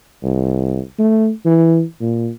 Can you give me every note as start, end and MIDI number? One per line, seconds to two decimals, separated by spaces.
0.23 0.80 36
0.99 1.30 57
1.45 1.82 52
2.01 2.30 46